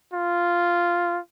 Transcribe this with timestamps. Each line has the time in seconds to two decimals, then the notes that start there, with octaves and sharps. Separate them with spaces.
0.13 F4